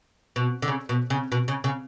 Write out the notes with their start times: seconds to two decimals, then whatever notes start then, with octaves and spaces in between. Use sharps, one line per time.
0.36 B2
0.62 D3
0.68 C#3
0.89 B2
1.10 C#3
1.32 B2
1.48 C#3
1.64 C#3